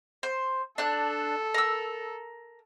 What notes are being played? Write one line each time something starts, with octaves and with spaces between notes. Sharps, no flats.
C5
D4 A4 F#6
A#4 E6